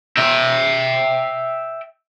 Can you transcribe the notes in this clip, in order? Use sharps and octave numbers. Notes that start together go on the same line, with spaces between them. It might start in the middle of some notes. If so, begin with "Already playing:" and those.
E5 G5